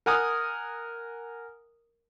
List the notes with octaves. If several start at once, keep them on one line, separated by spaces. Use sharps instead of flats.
A#4 F#5 G#5 A#5 D#6 F6